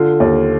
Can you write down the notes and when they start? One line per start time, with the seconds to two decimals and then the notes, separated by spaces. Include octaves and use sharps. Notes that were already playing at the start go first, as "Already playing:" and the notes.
Already playing: D3 F4
0.20 D#2